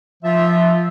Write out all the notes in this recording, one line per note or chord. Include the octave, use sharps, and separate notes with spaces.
F3 F4 E5